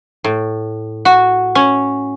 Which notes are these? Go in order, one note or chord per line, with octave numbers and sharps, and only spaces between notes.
A2
F#4
C#4